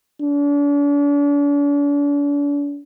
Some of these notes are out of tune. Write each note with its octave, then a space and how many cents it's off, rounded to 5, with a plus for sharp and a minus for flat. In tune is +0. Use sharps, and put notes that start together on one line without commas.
D4 -40